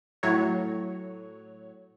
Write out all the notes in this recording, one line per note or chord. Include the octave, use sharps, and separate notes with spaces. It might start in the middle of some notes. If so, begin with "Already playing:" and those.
A2 F#3 C#5